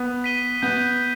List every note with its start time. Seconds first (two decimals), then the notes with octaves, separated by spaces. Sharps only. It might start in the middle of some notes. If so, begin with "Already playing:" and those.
Already playing: B3
0.24 B6 D#7 G7
0.62 B3 G6